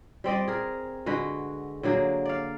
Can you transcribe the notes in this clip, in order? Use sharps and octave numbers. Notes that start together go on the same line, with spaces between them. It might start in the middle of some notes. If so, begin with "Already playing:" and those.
G3 C4 D5 D#5
G#4 A#4
D3 G#3 F#4 B4
D3 F#3 A#3 G#4
D5 F5